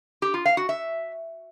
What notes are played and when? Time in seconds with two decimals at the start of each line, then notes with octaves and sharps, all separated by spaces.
0.22 G4
0.34 F4
0.45 F5
0.57 F#4
0.69 E5